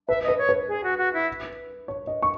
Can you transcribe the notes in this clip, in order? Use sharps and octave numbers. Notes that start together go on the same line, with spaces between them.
B4 E5
B4 D#5
C#5
B4
G#4
F#4
F#4
E4
C#5
D#5
C#6